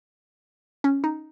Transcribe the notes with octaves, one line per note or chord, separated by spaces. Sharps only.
C#4
D#4